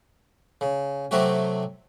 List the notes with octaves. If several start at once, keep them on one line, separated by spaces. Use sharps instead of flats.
C#3
C3 F#3 A3 F#4 G4